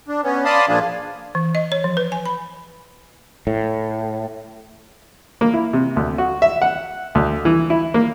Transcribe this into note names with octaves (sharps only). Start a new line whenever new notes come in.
D4
B3 C#4
D5 F5 A5 B5 C6 D#6
A#2 F3 D4 F4 G#4
E3
D#5
C#5
F3
B4
G#5
B5
A2
A#3
E4
C3
D2
F#4
E5
F#5
D2
E3
E4
A#3